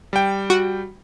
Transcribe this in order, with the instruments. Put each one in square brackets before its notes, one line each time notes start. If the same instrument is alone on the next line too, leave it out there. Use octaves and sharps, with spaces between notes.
[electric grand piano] G3 G5
[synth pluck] F#4